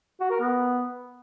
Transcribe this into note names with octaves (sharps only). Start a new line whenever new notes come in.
F#4
A#4
B3